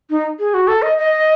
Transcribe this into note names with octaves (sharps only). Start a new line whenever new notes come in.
D#4
G#4
F#4
A4
D#5
D#5